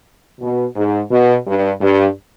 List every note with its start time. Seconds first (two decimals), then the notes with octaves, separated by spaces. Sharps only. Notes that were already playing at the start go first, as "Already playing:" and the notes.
0.41 B2
0.76 G#2
1.12 B2
1.47 G2
1.81 G2